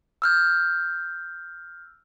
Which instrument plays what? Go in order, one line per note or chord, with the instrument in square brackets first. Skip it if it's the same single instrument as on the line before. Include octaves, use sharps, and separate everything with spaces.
[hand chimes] E6 F6 G6